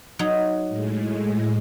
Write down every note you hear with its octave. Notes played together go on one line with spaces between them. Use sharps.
F#3 D#4
A2 G#3